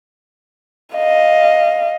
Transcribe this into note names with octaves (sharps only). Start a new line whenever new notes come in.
D#5 F5